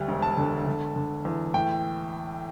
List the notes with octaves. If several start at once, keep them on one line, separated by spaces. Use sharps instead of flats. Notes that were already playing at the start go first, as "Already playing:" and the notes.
Already playing: D2 G3
E1
A5
D3
D3
D3
E2
A2 G5